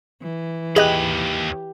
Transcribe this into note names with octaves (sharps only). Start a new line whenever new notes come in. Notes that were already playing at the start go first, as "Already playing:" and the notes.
E3
D#2 G4 G#4 D#5 B5 F#6